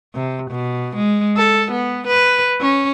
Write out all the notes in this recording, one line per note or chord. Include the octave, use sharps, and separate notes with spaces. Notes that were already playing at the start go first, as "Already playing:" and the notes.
C3
B2
G#3
A4
B3
B4
C#4